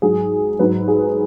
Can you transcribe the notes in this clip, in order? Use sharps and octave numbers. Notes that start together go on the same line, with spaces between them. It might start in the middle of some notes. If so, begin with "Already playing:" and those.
G#2 F#3 G#4
G#2 F#3 B4
G#4